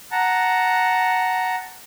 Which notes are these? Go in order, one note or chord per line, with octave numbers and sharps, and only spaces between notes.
F#5 A5 A#5